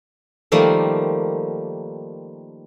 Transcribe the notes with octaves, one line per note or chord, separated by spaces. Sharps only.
D#3 F3 G3 A3 A#3